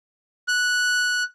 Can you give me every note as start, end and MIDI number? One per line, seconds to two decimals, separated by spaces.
0.48 1.23 90